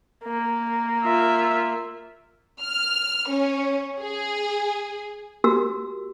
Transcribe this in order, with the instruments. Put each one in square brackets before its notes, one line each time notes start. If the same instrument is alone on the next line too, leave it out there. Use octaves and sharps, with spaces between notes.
[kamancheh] A#3
[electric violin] F4 E5
[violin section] F6
C#4
G#4
[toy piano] F#4 G4 A#4 E6